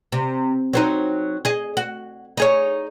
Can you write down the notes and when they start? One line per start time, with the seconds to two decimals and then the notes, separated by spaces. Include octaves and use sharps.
0.12 C3
0.73 F#3 C4 D#4
1.45 G#4 D#5
1.77 F#4
2.37 D#4 G#4 C#5